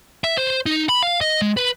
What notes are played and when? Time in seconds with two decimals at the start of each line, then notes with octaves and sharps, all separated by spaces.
0.24 E5
0.37 C5
0.66 D#4
0.89 B5
1.03 F5
1.21 D#5
1.42 G#3
1.57 B4